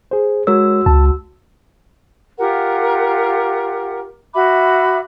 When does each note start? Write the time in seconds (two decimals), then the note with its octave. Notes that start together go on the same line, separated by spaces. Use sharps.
0.11 G#4 C5
0.47 G#3 F#4 A#4 C#5 E6
0.86 C#2 A5
2.38 F4 G4 A#4 F#5
4.34 F#4 E5 B5 D6